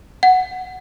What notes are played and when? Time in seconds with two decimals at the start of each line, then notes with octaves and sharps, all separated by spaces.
0.23 F#5